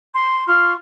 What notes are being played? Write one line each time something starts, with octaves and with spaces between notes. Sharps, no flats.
C6
F4 C6 C#6 F6